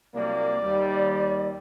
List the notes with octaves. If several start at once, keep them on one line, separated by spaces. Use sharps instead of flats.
C2 F#3 A#3 D5
D#2 G3